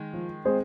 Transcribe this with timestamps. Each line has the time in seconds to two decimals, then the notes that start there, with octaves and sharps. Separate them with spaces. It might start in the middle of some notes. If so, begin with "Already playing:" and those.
Already playing: D#3 G#3
0.13 F3
0.45 G#3 C4 G#4 C5